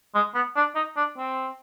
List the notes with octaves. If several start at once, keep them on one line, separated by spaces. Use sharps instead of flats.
G#3
B3
D4
D#4
D4
C4